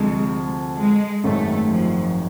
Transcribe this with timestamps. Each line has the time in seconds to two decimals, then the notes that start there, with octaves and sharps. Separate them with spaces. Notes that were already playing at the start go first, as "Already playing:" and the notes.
Already playing: D2 C3 F3 G#3
0.78 G#3
1.23 G#1 F#2 D#3 G#3 A3
1.69 F3